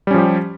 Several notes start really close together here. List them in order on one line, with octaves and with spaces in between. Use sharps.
G3 C#4 F3 G4